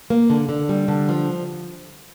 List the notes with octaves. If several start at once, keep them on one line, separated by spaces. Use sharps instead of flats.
A#3
D3
D3
G3
D3
F3